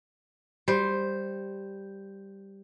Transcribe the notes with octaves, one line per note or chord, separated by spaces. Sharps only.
G3 C5